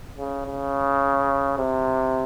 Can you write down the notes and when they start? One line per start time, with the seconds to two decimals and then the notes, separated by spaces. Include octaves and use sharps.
0.18 C#3
0.46 C#3
1.58 C3